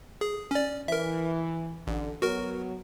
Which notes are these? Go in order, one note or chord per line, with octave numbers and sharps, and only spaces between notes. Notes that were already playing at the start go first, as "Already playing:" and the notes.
G#4
C#4 D5
E3 A#4 E5
A1 D3
F#3 B3 F#4 A#4